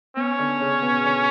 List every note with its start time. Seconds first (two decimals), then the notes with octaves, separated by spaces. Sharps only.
0.17 B3 C#4
0.39 D3
0.60 C#3
0.82 B2
1.04 D3